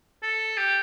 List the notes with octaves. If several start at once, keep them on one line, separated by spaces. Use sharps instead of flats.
A4
G4